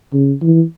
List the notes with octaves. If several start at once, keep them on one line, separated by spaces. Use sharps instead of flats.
C#3
E3